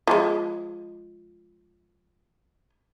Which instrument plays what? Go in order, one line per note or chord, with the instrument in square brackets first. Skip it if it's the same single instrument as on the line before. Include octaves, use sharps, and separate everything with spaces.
[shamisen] F3 G#3